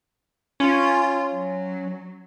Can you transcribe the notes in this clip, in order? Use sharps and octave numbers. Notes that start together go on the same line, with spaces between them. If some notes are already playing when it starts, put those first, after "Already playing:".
C#4 F4
F#3